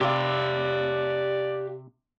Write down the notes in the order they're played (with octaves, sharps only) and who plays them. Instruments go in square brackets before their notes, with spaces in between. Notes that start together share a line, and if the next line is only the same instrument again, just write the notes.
[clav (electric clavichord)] C3 [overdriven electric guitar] G4 F5 [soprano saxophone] D5